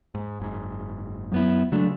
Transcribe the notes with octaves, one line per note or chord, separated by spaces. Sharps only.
G#2
F#1 G#2
F#2 B3 E4
C#3 F#3 G#3 A3 D4